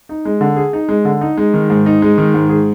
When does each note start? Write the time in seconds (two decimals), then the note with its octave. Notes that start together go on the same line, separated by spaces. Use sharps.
0.09 D#4
0.25 G#3
0.41 D3
0.56 G#4
0.73 D#4
0.89 G#3
1.05 D3
1.21 D#4
1.37 G#3
1.54 D#3
1.70 G#2
1.86 D#4
2.02 G#3
2.18 D#3
2.34 G#2
2.49 G#4